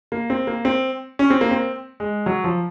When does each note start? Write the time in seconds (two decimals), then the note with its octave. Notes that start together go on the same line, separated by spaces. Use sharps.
0.12 A#3
0.30 C4
0.47 A#3
0.65 C4
1.19 C#4
1.30 C4
1.41 A#3
1.51 C4
2.00 G#3
2.26 F#3
2.44 F3